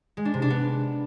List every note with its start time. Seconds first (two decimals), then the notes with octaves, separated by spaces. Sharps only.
0.17 G#3
0.25 D4
0.34 C3
0.42 D4
0.50 B3